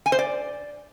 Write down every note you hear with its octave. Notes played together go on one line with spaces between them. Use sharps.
G#5
C5
D5